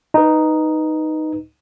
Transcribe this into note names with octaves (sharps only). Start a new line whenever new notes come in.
D#4 B4